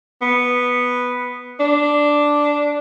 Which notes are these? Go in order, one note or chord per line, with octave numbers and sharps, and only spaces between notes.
B3
D4